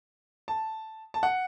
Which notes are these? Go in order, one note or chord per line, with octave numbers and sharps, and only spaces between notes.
A5
A5
F#5